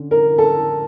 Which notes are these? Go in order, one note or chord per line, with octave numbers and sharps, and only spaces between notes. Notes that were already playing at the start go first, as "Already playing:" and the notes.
Already playing: D3 C#4
A#4
A4